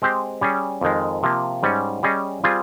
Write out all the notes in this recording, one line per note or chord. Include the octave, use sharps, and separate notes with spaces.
G#3 C4 G4 C5
G3 C#4 G#4
F2 D#3 G#3
C3 F3 A#3
G#2 G3 C#4
G3 C#4 G#4 D#5
G3 C4 F4 G#4